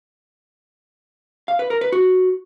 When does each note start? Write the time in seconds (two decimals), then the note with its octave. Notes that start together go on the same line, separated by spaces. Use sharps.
1.48 F5
1.59 B4
1.70 A#4
1.81 B4
1.92 F#4